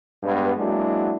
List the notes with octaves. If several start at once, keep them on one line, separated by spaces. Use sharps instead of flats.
G2 G#3 B3
F#3 G#3 A#3 D4 E4 F#4